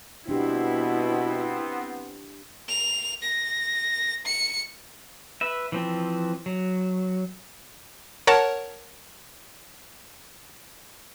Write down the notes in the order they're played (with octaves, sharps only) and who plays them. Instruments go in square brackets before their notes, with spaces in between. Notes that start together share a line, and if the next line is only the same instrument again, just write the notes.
[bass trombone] B2 [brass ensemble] B3 C4 C5 [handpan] D4 G4 [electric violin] E4
[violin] F7
A#6
C#7
[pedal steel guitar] B4 E5
E3 F3 C4
F#3
[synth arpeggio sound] A#4 C#5 F#5 A5